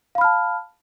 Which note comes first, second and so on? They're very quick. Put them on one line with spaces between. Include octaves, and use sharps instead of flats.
F5 B5 F6 A5